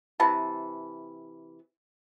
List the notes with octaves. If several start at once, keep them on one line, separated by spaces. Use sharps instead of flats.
C3 E3 B4 A5